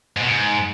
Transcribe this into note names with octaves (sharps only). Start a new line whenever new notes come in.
G#2
B2
G#2